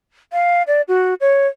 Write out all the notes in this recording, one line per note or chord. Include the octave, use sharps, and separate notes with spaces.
F5
D5
F#4
C#5